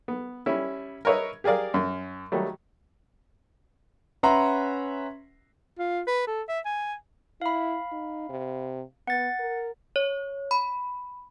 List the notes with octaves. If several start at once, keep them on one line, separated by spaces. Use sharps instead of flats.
B3
G3 C#4 E4
A#4 B4 C#5 D#5 E5
G4 G#4 A#4 D5 F5
F#2
D#3 F#3 G3 A3
C#4 B4 E5 F#5 A#5 C6
F4
B4
A4
E5
G#5
E4 F5 B5
D#4
C3
B3 F#5 A6
A#4
C#5
B5